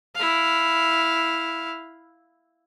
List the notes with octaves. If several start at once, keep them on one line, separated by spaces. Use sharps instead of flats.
E4 F5